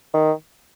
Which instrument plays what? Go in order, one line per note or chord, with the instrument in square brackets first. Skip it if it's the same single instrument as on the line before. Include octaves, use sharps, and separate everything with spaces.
[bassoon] D#3